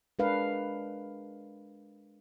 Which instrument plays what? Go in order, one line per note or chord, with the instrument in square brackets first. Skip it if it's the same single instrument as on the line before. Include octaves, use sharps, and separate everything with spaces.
[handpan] G#3 D4 A#4 B4 F5